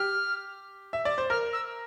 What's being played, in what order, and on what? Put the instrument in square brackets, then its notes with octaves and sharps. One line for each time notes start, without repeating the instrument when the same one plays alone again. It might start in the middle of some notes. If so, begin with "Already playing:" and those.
Already playing: [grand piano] G4 [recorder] F6
[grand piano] E5
D5
C5
[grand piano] A#4 [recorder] F6
[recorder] E6